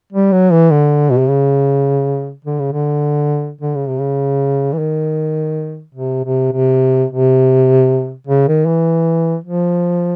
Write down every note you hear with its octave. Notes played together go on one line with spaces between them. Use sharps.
G3
F#3
E3
D3
B2
C3
C#3
D3
C#3
D3
D3
C#3
C3
C#3
E3
D#3
C3
C3
C3
C3
C#3
D#3
E3
F3